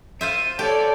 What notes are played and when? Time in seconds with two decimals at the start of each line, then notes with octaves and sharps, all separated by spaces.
0.21 F4 C5 E5 D#7
0.59 G4 A4 C#5 D5